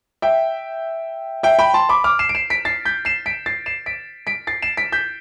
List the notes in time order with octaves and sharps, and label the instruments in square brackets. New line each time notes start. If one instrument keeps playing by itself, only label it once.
[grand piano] E5 G5
E5 G5
G5 B5
A5 C6
B5 D6
D6 F6
C7 E7
D7
C7 E7
B6 D7
A6 C7
G6 B6
C7 E7
B6 D7
A6 C7
C7 E7
B6 D7
B6 D7
A6 C7
C7 E7
B6 D7
G6 B6